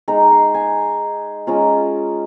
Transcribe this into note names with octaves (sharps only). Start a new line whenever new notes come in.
G#3 D#4 A#5
C6
G#5
G#3 C#4 F4 A#5